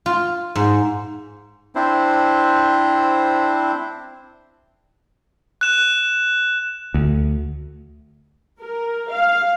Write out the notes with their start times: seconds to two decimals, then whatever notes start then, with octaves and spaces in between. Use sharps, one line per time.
0.06 F4
0.55 G#2
1.75 C4 D4 E4 C5
5.61 F#6 E7
6.94 D2
8.60 A#4
9.11 F5